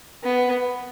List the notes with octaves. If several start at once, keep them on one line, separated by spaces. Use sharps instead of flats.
B3